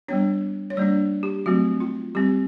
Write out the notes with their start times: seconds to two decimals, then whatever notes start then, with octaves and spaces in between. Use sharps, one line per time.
0.08 G3 B3 D4 C#5
0.70 C#5
0.77 G3 A#3 D4 D5
1.23 G4
1.46 F#3 A3 C4 F#4
1.80 F4
2.15 G3 C4 G4